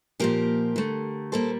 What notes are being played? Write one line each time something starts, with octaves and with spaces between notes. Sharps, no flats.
A#2 F3 A#3 G4 A#4
D3 A3
A#2 G3 A#3 A4 C5